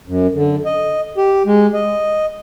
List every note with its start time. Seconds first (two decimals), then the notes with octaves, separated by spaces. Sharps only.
0.07 F#2
0.34 D3
0.66 D#5
1.18 G4
1.46 G#3
1.74 D#5